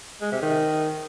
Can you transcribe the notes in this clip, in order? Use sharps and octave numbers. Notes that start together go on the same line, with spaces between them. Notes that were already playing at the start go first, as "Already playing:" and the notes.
G#3
C3
D#3